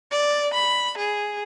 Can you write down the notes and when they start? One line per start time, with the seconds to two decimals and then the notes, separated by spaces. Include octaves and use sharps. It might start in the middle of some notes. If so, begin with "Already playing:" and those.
0.12 D5
0.54 B5
0.98 G#4